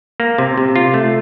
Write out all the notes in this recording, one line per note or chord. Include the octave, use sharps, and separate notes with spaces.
A#3
C3
C3
F4
A3